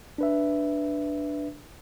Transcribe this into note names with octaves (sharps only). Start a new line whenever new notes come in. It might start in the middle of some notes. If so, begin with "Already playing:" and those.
D4 B4 E5